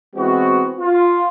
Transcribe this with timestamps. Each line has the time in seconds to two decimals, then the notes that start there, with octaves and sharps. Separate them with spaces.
0.15 E3 G#3 B3 C4 F#4
0.79 F4